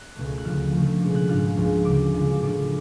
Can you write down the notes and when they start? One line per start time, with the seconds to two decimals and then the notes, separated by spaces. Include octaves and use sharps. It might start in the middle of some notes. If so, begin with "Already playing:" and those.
Already playing: F#6
0.16 C#2 B2 A3
0.38 F#6
0.45 D2 C#3 F3 F6
0.73 C#3 F3 A3
1.01 B2 G#3 D4
1.15 F#6
1.29 G#2 G#3 D4 F4 F6
1.56 C#2 C#3 F3 G#3
1.85 D2 C#3 F#3 D6
2.14 C#3 G#3 D4 F4
2.42 A2 F3 B3 D4 F4 D6